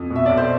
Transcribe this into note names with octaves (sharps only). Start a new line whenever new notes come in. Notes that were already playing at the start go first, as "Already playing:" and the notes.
Already playing: F2
B2
E5
B1 D5
C5